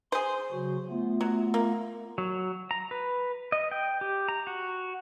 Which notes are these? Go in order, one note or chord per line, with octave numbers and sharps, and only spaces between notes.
G#4 C5 C6
C#3 F#3 F#4
A3 B3 F4
F#3
A#3
F#3
A#5
B4
D#5
G5
G4
A#5
F#4